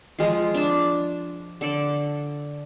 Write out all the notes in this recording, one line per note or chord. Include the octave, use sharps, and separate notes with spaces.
F3 G#3 F4
D4 A5
D3 A4 D5